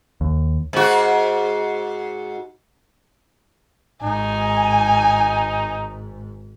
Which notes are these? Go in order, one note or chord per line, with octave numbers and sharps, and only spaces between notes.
D#2
G#2 F#4
G#1 G#2 D#4 G#5